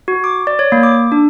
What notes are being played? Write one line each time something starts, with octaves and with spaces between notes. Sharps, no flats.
F#4
D6
D5
C#5
A#3
D6
D4